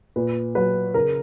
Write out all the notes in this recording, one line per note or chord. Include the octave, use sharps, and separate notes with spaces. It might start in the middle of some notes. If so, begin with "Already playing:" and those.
A#2 B4
F#3 B4
C#3 A#4